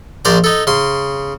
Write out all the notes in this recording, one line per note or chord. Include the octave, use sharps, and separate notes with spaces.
A#1 C5 D5 A#5
D#4 A4
C#3 C6